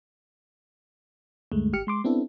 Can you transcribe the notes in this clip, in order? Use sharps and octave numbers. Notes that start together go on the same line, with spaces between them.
D2 G2 G#3 A3
G#1 G4 F6 C#7
G#3 C6 D6
B3 C4 D4 E4 A4